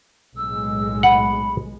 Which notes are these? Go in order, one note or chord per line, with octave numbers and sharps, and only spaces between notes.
B1 A2 G#3 E6
F#5 B5